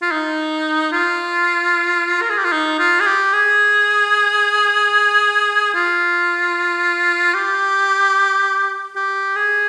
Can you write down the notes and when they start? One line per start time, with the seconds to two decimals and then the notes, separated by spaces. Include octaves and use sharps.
0.02 F4
0.12 D#4
0.92 F4
2.22 A#4
2.30 G#4
2.38 G4
2.45 F4
2.52 D#4
2.79 F4
3.01 G#4
3.06 G4
3.33 G#4
5.75 F4
7.35 G4
8.96 G4
9.36 G#4